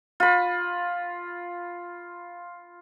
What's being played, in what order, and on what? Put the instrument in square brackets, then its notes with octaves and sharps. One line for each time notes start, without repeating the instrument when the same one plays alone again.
[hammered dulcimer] F4 B5